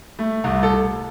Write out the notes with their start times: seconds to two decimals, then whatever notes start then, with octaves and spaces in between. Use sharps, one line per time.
0.19 A3
0.44 C2
0.63 A4